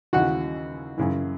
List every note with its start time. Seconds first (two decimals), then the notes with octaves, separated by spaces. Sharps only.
0.13 D#2 C#3 E3 F#4 F#5
0.98 F#2 C#3 E3